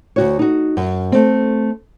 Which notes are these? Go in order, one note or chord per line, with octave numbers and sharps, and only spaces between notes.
D2 F#4 C#5
D#4 F#4
F#2
A3 C4